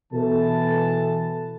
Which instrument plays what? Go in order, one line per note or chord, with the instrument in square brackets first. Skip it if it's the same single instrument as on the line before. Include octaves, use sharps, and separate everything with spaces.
[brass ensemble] B2 E3 A4 A5